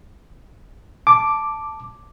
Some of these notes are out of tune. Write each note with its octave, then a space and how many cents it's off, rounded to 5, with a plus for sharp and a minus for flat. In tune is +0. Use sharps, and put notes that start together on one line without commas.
A5 +0 D6 +0